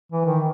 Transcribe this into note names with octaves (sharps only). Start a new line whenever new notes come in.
E3
D#3